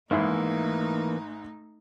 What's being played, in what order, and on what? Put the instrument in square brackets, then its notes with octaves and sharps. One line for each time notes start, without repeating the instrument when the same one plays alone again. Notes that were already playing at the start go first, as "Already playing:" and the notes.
[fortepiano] G#1 G#2 E4 [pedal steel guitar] E3 A#3 [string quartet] A3 D#4